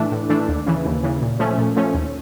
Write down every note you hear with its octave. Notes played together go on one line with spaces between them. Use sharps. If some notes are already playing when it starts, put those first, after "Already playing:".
Already playing: A2 E3 A3 D4
A2
E3 A3 D4
D#2
C#3 E3
D#2
C#3 E3
A#2
F3 A3 C#4
A#2
F3 A3 C#4
D#2